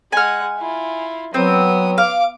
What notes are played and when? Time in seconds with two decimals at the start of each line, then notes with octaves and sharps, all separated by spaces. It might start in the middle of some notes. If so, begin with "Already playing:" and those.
0.12 G#3 F#5 G#5 F6
0.59 E4 F4
1.34 F#3 B3 C4 D#6
1.98 F5 D6